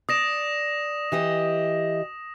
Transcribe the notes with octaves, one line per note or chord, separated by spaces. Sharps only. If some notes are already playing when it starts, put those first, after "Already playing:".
D5 D#6 A#6 E7
E3 G4 D#5